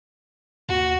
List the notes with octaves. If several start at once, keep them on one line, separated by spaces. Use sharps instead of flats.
D#2 F#4